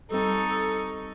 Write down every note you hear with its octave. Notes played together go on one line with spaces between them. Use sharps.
G3 C4 D#4 A4 C#6